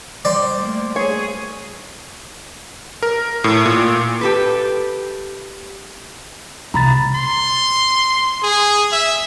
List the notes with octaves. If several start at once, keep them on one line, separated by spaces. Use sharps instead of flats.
G3 C5 D5 C6
A3 A#3
G#4 C#5 C7
A#4
A2
A#2
G4 A4 B4
C2 A#5 B5 A6
C6
G#4
E5